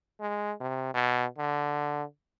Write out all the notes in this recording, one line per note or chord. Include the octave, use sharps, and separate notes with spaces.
G#3
C3
B2
D3